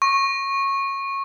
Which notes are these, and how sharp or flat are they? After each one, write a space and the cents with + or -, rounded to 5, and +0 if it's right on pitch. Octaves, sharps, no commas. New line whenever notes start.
C#6 -15